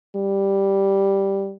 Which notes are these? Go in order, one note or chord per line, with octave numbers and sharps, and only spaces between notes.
G3